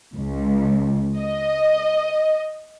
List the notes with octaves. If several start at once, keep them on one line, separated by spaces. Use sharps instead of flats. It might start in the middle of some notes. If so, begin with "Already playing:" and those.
C#2
D#5